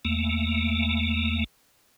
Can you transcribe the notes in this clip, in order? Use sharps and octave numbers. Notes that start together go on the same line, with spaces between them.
E2 A3 A#3